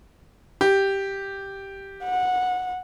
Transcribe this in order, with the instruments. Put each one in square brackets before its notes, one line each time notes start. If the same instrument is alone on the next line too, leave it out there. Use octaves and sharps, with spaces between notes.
[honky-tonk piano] G4
[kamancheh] F#5